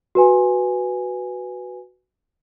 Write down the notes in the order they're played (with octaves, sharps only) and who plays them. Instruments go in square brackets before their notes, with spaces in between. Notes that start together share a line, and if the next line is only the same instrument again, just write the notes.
[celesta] F#4 B4 G#5